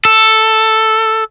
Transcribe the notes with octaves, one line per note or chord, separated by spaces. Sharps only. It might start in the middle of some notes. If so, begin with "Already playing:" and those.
A4